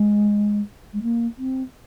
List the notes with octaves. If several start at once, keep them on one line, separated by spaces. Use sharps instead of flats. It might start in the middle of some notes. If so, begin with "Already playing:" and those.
Already playing: G#3
G#3
A#3
C4